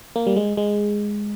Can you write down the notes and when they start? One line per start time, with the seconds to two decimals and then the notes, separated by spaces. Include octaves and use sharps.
0.16 A#3
0.27 G3
0.36 G#3
0.57 G#3